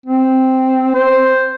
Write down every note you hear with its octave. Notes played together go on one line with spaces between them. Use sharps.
C4
C5